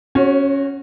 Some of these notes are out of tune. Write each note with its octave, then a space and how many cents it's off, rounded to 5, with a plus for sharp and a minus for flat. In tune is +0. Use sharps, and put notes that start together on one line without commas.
C#4 +0 F#4 +0 C#5 -40